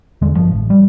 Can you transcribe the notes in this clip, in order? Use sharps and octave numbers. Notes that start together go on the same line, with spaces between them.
D#1 E2 D3 G#3
G#1 G2 F3
A1
G3